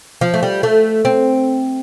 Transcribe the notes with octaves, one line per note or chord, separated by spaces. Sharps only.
F3
A3
G3
A3
C4